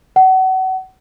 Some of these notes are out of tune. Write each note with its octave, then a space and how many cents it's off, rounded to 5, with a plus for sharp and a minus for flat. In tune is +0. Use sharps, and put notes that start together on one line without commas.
F#5 +30